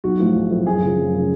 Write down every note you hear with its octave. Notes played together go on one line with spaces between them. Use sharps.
B1 F#4
A2 F3 A3
B1
A2 F3 A3
F#2 G#4
C#3 F3
F#2
C#3 F3